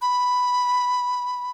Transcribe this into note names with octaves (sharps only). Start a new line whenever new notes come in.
B5